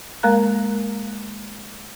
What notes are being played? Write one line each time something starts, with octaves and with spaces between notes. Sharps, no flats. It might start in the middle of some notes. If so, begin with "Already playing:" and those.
G#3 A#3 A#4 F5 A#5 F#6